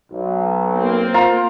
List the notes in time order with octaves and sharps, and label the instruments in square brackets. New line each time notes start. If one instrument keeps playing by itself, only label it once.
[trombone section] B1
[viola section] A#3 C4
[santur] F4 A#5